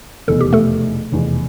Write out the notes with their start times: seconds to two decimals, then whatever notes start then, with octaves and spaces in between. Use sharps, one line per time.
0.28 F1 E2 B2 A4
0.41 G4
0.53 A3 A4
1.11 F1 E2 B2